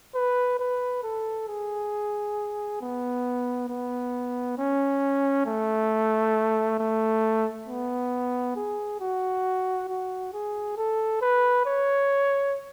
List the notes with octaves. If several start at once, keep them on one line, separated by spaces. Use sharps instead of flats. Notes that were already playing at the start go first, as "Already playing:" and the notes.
B4
B4
A4
G#4
B3
B3
C#4
A3
A3
B3
G#4
F#4
F#4
G#4
A4
B4
C#5